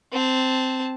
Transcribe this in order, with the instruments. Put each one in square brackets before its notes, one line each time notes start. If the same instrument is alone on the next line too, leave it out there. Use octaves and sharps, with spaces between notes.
[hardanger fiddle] C4 A5